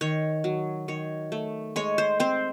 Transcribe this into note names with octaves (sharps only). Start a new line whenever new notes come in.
D#3 C#5
F#3
D#3 C#5
A3
G#3 C#5
C5
C4 C5